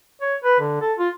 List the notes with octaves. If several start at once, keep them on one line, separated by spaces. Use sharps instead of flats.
C#5
B4
D3
A4
F4